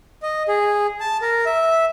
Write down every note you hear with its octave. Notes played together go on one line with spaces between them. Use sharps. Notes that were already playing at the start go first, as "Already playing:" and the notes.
D#5
G#4
A5
A#4
E5